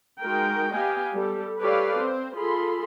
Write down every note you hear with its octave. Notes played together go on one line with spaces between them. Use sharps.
G#3 D#4 F#4 A#4 G5
B3 G4 D#5 F5 G5 G#5
G3 A4
G4 A4 B4 C#5 D5 F5
C4 C5
F4 G#4 A4 B5 C6